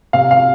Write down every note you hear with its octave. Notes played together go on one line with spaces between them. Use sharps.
C3 F5
F5